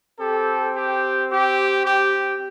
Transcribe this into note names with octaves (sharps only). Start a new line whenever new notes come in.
C4 G4 A4
G4
G4
G4